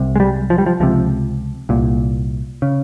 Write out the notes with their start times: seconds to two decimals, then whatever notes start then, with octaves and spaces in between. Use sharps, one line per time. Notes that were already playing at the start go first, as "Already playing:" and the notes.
Already playing: C2 C3
0.16 G#3
0.20 G3
0.50 F3
0.58 G3
0.66 F3
0.80 C#2 C3 F3
1.69 C2 A#2
2.62 C#3